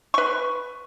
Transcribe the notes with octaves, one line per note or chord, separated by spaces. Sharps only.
B4 C#6